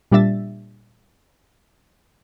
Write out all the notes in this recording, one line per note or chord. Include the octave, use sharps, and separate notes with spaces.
A#2 G3 D4 E5 A6